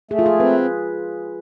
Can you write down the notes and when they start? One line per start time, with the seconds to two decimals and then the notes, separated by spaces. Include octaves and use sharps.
0.11 A3 G#4
0.19 F4
0.26 G#4
0.40 C4 B4